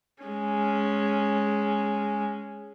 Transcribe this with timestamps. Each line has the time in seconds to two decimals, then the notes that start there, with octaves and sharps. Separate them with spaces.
0.23 G#3 C#4